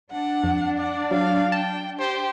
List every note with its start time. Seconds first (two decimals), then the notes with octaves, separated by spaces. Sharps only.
0.11 D4 F#5
0.44 F2
0.79 D5 F#5
1.11 F#3 F5
1.52 G5 A5
1.99 G4 C5